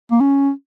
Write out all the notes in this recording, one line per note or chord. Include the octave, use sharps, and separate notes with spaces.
A#3
C#4